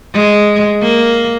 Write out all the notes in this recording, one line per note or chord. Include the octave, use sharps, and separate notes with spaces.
G#3
A#3